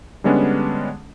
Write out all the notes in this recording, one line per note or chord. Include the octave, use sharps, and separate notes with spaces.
D3 G3 G#3 B3 C#4 D4